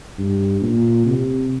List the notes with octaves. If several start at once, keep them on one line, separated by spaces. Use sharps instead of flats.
G2
A#2
C3